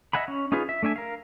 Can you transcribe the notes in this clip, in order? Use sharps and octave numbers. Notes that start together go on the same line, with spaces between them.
D#5 E5 F#5 G#5 B5
C#4
C#4 D#4 F4 G#4 B4
E5
A3 D4 E5 G#5
A#4 F5